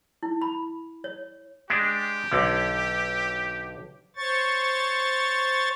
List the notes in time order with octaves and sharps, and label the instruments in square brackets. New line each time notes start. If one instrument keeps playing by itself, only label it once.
[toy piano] E4
B5
C#5
[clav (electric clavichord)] G#3 D4 [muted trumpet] G4
[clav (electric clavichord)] B1 D3
[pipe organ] C5 C#5 C#6 A6